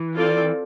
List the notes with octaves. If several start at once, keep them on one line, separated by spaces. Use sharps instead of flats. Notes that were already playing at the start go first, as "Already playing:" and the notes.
Already playing: E3
C4 F4 A4 D5